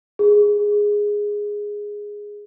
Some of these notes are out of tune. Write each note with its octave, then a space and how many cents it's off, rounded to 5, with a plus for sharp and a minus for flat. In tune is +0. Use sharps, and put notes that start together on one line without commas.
G#4 -5